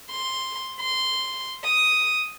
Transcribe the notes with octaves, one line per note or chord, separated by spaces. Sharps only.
C6
C6
D#6